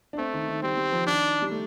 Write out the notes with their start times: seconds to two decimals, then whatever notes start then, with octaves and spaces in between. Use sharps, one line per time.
0.13 D4
0.18 A3 C4
0.34 D#3
0.49 D#3
0.63 G3 C4
0.77 G3
0.92 F3
1.07 D#3 D4
1.42 G3
1.51 A3